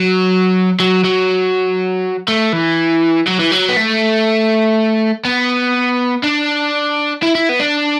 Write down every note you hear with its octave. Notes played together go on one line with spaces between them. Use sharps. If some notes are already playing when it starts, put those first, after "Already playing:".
Already playing: F#3
F#3
F#3
A3
E3
F#3
E3
F#3
B3
A3
B3
D4
E4
E4
B3
D4